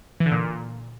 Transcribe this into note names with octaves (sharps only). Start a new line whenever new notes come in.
E3
D3
A#2